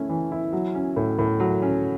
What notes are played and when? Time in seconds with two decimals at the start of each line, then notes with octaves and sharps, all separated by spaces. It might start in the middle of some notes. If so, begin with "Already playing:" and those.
Already playing: A3 C#4 E4
0.09 E3
0.32 E4
0.53 F#3
0.75 C#4
0.96 A2
1.19 A2
1.40 F#3
1.62 C#4